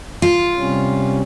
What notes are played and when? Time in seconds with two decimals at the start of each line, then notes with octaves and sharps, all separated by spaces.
0.22 F4
0.57 C3 G3 C#4